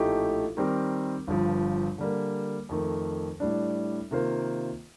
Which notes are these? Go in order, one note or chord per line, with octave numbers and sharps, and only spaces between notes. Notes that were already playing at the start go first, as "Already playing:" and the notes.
Already playing: A#1 A2 A3 D#4 G4
D#3 G3 C4 G4 A#4
G1 G2 F3
D3 G3 A#3
F2 D#3 A3
A2 G3 D4
C3 D#3 A#3 F4 C5